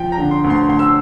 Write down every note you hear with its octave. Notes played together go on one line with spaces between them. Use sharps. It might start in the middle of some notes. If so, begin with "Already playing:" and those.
Already playing: F3 G5
A#5
D3
C6
D2
C6
D2 C6
E6